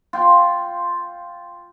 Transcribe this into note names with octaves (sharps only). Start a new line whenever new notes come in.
F4 G5